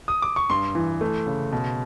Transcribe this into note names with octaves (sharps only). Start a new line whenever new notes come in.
D#6
D6
C#6
G2 C6
E3
A3
C#3
B2